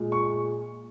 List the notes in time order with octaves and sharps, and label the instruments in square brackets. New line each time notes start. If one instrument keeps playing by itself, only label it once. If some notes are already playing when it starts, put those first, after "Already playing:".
Already playing: [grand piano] A#2 G#3
C#6